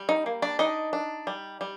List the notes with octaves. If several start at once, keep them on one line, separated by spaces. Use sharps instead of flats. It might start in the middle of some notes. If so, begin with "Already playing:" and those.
Already playing: G3
D#4
A#3
D4 D5
D4 D#4 D#5
D4
G3
G3